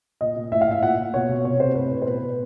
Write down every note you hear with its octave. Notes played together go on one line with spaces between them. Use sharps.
A#2 D#5
A#2
A2 E5
F5
A2 E5
A#2 F#5
A#2
B2 C#5
B2
C3 C#5
C3 C5
A2 B4
A2
C5
B2 B4
B2